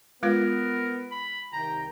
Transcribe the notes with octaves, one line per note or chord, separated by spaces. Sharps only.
G#3 B3 F4 A#4 B4
B5
C2 D#3 G5 A#5